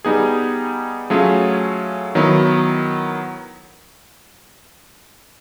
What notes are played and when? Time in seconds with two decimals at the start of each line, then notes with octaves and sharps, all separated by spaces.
0.05 G3 B3 D#4 G#4
1.10 F#3 A3 C#4 F4 G#4
2.15 D#3 F#3 B3 E4